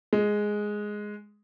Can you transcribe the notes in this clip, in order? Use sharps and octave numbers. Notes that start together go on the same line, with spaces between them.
G#3